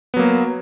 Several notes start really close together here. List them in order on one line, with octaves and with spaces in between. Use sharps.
B3 F#3 A#3